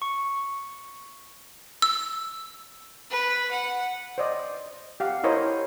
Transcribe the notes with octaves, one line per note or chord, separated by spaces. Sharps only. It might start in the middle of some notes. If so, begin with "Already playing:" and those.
C#6
E6
B4
F#5
C5 D5 D#5
G4 F5 F#5
E4 G4 A#4 C5 C#5 D#5